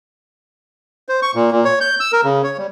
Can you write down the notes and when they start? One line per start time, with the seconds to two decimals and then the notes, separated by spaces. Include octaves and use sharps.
1.09 C5
1.22 C#6
1.35 A#2
1.52 A#2
1.65 C#5
1.81 G6
2.00 E6
2.12 A#4
2.24 C#3
2.44 C#5
2.58 G3